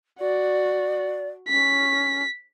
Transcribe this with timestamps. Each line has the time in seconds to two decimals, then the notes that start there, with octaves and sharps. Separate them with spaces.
0.20 F#4 D5
1.48 C#4 B6